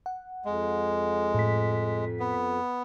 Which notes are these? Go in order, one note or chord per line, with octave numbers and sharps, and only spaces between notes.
F#5
F2 G#3
A2 B6
B3